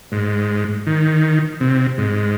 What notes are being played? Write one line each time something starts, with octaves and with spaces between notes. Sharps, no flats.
G#2
D#3
C3
G#2